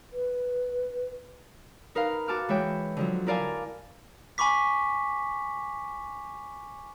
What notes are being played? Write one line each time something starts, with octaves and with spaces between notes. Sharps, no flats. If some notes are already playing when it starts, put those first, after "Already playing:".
B4
D#4 A#4 B4 F5
F#4 A5 D6 F6
E3 G#3 C#5 E5 G5
D3 F3 F#3
E4 A#4 D5 F5 G#5 A5
G#5 B5 C#6 D6 B6